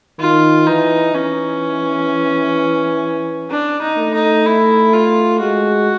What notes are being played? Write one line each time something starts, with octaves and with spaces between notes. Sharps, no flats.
D#3 F4
E3 D#4
E3 C#4
D4
D#4
A3
D#4
E4
F4
G#3 F#4